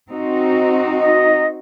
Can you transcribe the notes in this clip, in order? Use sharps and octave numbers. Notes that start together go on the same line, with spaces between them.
C4 D#4 F#4
D#5